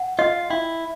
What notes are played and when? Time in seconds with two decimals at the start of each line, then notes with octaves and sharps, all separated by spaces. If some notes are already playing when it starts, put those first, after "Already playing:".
Already playing: F#5
0.19 F4 D#5
0.50 E4 G5